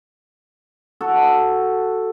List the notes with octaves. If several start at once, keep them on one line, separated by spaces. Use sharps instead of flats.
F#4 A4